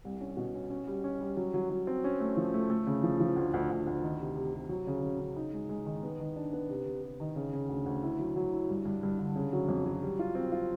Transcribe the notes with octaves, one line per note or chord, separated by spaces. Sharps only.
C2
C#4
B2
C#4
C#4
G3
C#4
G3
F#3
F#3
F#3
C4
C#4
A3
F3
A3
A3
C#3
F3
F3
D2
D2
D2
D2
D#3
C3
C3
C3
F#3
C#3
C#3
C#3
D#4
G#3
G#3
D#3
B3
D#3
D4
B3
C3
C3
C3
D#3
C#3
C#3
D2
D2
E4
F#3
F#3
E4
G2
G2
G2
D3
C#3
F#3
F2
F#3
G3
F4
C4
F4